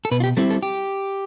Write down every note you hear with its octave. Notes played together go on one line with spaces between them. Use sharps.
A4
B2 B4
F4
G4
G3 C4 E4 A4
A4
G4